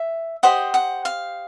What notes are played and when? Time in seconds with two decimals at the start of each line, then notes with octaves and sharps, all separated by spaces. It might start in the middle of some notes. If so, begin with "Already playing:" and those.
Already playing: E5
0.43 G4 C5 D#5 F#5
0.74 F#5
1.05 F5